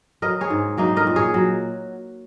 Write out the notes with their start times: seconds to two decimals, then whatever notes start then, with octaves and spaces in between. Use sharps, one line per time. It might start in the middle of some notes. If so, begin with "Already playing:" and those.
0.22 F#3 A#4 D#5
0.41 G#4 C#5
0.50 G#2
0.77 F#3 A#3 D#4
0.96 A#4 D#5
1.07 A#2
1.16 G#4 C#5
1.34 F#3